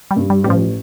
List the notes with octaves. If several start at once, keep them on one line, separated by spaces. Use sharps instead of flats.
G3
G2
G3
A1 G3
F3